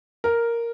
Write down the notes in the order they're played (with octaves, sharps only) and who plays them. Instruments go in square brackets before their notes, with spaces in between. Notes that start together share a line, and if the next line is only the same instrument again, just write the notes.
[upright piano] A#4